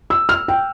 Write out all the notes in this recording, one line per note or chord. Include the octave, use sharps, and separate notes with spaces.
E6
F6
G5